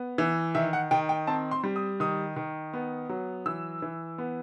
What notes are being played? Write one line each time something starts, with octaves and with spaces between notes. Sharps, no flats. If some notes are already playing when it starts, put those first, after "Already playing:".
Already playing: B3
E3
D#3 E5
F#5
D#3 G5
G5
C4 A5
C6
G3
D#6
D#3 D#6
D#3
B3
F#3
E3 E6
E3
B3